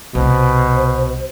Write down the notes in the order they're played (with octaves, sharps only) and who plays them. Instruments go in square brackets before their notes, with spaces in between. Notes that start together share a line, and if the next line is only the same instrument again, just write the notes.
[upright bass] C2 [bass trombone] B2 [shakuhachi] C5